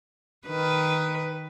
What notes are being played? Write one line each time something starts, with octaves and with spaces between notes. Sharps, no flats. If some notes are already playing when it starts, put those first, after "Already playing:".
D#3 B4